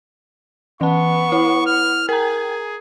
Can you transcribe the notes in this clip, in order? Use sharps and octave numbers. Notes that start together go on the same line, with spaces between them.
E3 B3 A5 C#6
E4
F6
G#4 A#4 G#5 A#5